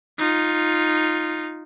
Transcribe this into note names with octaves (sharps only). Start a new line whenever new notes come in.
D#4 F4